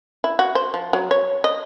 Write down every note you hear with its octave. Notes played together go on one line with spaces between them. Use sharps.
E4
F#4
C5
F3
F#3
C#5
D#5